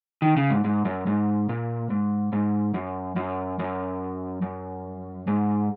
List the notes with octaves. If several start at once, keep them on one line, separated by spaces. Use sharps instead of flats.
D#3
C#3
G#2
G#2
F#2
G#2
A#2
G#2
G#2
F#2
F#2
F#2
F#2
G#2